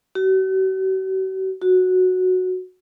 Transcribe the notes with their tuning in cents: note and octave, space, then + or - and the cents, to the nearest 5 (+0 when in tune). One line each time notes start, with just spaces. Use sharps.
F#4 +45
F#4 -5